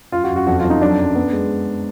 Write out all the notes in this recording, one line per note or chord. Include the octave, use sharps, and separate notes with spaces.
F#2 F4
F#4
F#2
F#4
F2 F#4
F4
F2
D#4
F#3 D4
F#2
B3
G#3